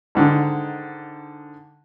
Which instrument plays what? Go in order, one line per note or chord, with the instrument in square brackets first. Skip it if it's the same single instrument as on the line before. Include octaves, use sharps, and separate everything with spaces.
[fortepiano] G#2 D3 D#3